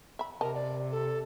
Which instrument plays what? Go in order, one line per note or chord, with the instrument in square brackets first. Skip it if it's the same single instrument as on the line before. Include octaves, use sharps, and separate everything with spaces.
[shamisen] E5 B5
[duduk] C3 [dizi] A#4 [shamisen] D#5 A5
[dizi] D5
A4